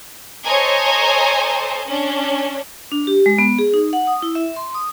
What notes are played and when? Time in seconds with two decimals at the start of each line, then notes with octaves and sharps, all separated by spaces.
0.44 A4 C5 C#5 D#5 G#5 A#5
1.85 C#4 D4
2.92 D4
3.07 G4
3.26 G#3
3.39 B3
3.59 G#4
3.74 D#4
3.93 F#5
4.07 D#6
4.22 E4
4.35 E5
4.56 C6
4.75 D#6